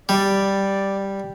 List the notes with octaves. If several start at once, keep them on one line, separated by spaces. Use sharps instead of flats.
G3 D5